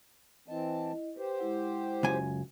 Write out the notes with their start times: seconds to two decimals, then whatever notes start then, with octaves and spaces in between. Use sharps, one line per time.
0.48 E3 C4 E4 D#5 A5
1.17 G4 B4 C5
1.38 G#3 E4 F#5
2.03 C#2 F#2 G#5